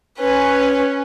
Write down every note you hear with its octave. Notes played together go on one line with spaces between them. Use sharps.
C#4 B4